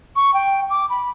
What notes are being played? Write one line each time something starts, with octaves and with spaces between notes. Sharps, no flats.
C#6
G5
D6
B5